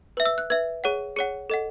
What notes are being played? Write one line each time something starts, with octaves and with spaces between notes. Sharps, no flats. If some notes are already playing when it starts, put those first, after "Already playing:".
B4 E5
E6
F#6
B4 E5 G#6
G#4 C#5 F#5
G#4 C#5 F#5 C#7
A4 D#5 F#5